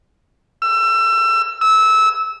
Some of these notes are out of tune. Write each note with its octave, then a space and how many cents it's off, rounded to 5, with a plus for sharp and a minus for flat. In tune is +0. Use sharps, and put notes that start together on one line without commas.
E6 +30
E6 -20